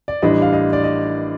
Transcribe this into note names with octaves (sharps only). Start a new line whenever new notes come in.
D5
A1 A2 G3 D4 D#5
F5
D#5
D5
D#5